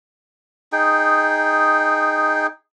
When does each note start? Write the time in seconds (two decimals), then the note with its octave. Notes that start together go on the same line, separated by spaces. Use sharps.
0.72 D#4 G#4 G5